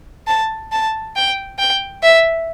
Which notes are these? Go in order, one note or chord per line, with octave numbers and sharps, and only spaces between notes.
A5
A5
G5
G5
E5